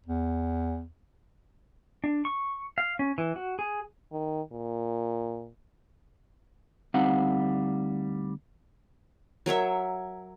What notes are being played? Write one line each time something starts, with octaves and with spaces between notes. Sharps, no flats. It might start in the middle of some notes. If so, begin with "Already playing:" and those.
E2
D4
C#6
F5
C#4
E3
F#4
G#4
D#3
A#2
D2 G3 C4 D#4 F5 F#5
F#3 A#4 C#5 E5